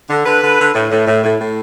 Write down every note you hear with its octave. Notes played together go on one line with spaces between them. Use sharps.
D3
D3 B4
D3
D3
A2
A2
A2
A2
A2